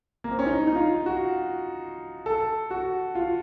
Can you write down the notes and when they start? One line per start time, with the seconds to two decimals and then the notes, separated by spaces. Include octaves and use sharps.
0.24 A#3
0.31 C4
0.39 C#4
0.46 D#4
0.67 D#4
0.76 F4
1.06 F#4
2.26 A4
2.71 F#4
3.15 F4